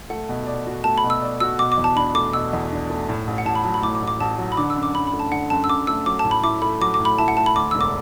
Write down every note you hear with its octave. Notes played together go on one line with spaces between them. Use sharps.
A3 F#5
B2
D5
F#4
A3 A5
B5
B2
E6
D5
F#4 E6
B2 D6
D6
E2
A5
D4 B5
A3 D6
B2 E6
E2
D4
A3
A2
A1
F#5
A1 A5
B5
F#3 A5
B5
A2 D6
D6
A1
D6
A1 A5
F#3
B5
D3 D6
E6
F#2
D6
F#2 B5
B5
A3
A5
D3 F#5
F#2 A5
E6
F#2 D6
A3 E6
F#3 D6
A5
A2
B5
E4 D6
A3 B5
F#3 D6
D6
A2
B5
E4 A5
F#5
A3 A5
B5
D2 D6
E1 E6
D6